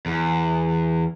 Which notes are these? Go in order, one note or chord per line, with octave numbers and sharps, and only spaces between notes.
E2